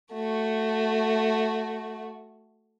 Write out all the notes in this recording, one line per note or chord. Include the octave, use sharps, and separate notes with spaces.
A3 F#4